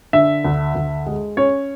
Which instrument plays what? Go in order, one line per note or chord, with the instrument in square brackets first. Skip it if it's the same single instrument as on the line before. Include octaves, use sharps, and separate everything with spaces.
[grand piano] D3 E5
D2
D2
G#3
C#4 C#5